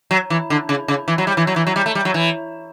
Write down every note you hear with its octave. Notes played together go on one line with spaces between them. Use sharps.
F#3
E3
D3
C#3
C#3
E3
F#3
G3
E3
F#3
E3
F#3
G3
A3
G3
F#3
E3